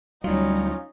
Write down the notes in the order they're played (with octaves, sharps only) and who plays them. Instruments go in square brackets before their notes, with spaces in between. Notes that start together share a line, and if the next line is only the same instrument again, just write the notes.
[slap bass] D2 F#3 [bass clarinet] G3 [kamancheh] C#4 D#4 [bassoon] F4